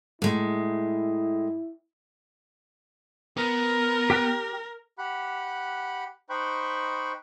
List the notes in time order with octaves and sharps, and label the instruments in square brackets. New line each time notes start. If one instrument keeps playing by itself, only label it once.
[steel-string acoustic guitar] A2 G#3 [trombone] E4
[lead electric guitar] B3 [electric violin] A#4
[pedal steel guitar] G4 G5 F#6
[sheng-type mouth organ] G4 F#5 B5 F#6
D#4 C5 G5 B5 C#6 F#6